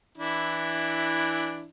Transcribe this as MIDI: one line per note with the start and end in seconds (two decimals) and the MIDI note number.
0.18 1.68 52
0.18 1.68 62
0.18 1.68 64